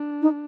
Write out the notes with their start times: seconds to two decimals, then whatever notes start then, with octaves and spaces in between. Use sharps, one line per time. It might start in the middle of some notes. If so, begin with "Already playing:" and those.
Already playing: D4
0.22 D#4